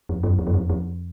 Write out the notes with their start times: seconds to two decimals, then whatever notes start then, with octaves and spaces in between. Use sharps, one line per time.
0.09 F2
0.23 F#2
0.39 F2
0.47 F#2
0.54 F2
0.70 F2